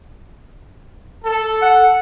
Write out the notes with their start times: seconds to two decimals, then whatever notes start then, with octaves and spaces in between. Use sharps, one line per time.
1.24 A4
1.62 F#5